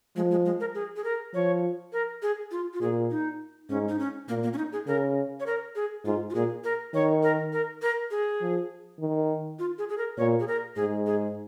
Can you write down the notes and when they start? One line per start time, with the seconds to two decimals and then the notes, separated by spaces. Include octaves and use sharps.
0.16 F3 G#3
0.31 G#3
0.45 G#3
0.60 A#4
0.75 G#4
0.96 G#4
1.04 A#4
1.34 F3 C#5
1.93 A#4
2.22 G#4
2.51 F4
2.74 F4
2.81 A#2 G#4
3.11 D#4
3.70 G#2 C#4
3.89 D#4
3.99 C#4
4.28 A#2 A#3
4.44 A#3
4.53 C#4
4.58 D#4
4.72 G#4
4.87 C#3 A#4
5.40 C#5
5.46 A#4
5.76 G#4
6.05 G#2 F4
6.30 F4
6.35 A#2 G#4
6.64 A#4
6.94 D#3 C#5
7.23 A#4
7.53 A#4
7.82 A#4
8.11 G#4
8.41 F3
9.00 D#3
9.59 F4
9.78 G#4
9.89 G#4
9.98 A#4
10.18 A#2 C#5
10.40 G#4
10.48 A#4
10.76 G#2 G#4
11.07 G#4